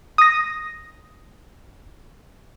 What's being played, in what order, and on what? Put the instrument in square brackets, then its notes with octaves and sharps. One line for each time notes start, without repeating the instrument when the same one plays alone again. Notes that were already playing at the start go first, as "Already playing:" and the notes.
[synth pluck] D#6 A#6